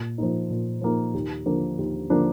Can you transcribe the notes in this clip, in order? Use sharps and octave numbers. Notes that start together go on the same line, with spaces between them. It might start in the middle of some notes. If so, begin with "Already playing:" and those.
Already playing: A#2
F3 A#3 D#4
A#2
F3 A#3 D#4
D#2
D3 F3 A#3 D4
D#2
D3 F3 A#3 D4